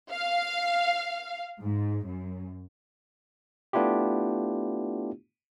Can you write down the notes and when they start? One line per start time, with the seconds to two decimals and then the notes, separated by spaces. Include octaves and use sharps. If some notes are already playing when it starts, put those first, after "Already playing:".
0.10 F5
1.61 G#2
2.06 F#2
3.73 A3 B3 D4 E4 F4 G4